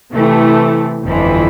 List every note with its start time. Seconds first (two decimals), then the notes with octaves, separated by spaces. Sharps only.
0.12 C3 E3 A3
1.02 G1 F2 E3